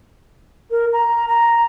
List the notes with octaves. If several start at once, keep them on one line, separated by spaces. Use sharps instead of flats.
A#4
A#5
A#5